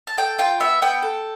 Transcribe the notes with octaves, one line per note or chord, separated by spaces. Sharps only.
A5
A4 G5
F4 G5
B3 E5
B3 G5
A4